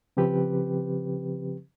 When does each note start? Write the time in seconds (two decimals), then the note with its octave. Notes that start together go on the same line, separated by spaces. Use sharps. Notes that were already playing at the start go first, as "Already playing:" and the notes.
0.17 C#3 F3 C4 G4 B4